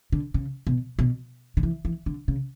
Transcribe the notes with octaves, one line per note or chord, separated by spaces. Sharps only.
D3
C#3
B2
B2
D3
E3
E3
D3
C#3